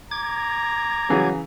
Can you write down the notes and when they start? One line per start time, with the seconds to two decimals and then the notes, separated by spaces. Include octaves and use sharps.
0.11 A#5 D6 G#6
1.10 C#3 E3 F#3 G#4